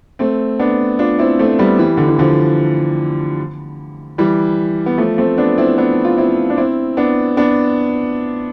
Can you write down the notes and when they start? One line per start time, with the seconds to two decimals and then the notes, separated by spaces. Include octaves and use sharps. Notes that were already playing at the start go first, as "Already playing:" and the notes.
0.19 A3 C4
0.59 B3 D4
0.99 D4 F4
1.19 C4 E4
1.39 A3 C4
1.59 G3 B3
1.79 E3 G3
1.97 D3
2.08 E3
2.19 D3 F3
4.18 E3 G3
4.86 B3
4.98 F3 A3
5.18 A3 C4
5.38 B3 D4
5.58 C4 E4
5.78 B3 D4
6.05 F4
6.18 C4 E4
6.50 D4
6.57 C4 E4
6.97 B3 D4
7.37 B3 D4